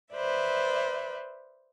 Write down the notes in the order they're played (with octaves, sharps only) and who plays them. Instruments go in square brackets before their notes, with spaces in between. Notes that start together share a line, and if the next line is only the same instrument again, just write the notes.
[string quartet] B4 C5 D5 E5